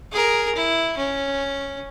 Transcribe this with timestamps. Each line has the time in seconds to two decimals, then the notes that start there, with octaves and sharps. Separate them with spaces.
0.12 G#4 A#4
0.55 E4
0.97 C#4